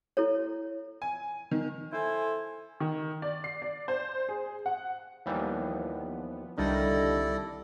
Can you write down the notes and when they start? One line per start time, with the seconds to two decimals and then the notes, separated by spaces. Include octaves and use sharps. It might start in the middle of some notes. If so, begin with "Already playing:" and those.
0.17 E4 A4 C#5
1.02 G#5
1.51 D#3
1.93 E4 A4 C5 G#5
2.80 D#3
3.22 D5
3.44 C7
3.62 D5
3.88 C5
4.29 G#4
4.66 F#5
5.26 D#2 E3 F3 G3 B3
6.58 C2 D3 D#3 G3 E4 A4 D5 A#6